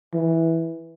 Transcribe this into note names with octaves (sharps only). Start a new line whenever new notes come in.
E3